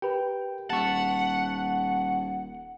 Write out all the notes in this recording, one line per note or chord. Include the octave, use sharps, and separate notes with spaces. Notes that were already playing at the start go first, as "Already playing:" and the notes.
G4 A#4 B4 G5
D#1 F#5 A5 C#6